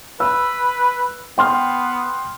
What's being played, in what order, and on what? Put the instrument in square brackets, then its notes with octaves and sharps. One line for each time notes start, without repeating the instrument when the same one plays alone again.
[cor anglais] B4 [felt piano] E6
[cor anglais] B3 [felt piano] G5 C6 F6